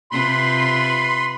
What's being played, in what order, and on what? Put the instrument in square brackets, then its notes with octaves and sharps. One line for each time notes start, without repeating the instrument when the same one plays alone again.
[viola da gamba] C3 F4 B4 [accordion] B5 C6